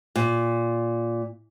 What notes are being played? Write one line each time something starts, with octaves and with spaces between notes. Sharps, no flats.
A#2